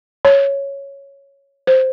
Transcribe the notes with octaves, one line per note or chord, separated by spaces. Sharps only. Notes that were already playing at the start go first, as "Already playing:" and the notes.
C#5
C5